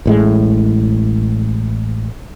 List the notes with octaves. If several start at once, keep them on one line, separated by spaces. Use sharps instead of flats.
A1 A2 G#3